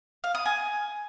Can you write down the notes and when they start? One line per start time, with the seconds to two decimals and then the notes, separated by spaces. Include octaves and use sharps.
0.24 F5
0.35 D#6
0.45 G#5